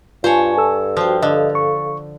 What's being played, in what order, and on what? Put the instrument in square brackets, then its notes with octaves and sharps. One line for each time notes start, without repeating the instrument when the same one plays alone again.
[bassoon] G2 [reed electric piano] F4 [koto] C5 C#5 [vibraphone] G#5 A5 C#6
[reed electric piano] A4 E6
[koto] F3 [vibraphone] F#4 C5 G5
[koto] D3 [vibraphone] A4 F5 [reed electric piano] D#5
[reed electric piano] C#6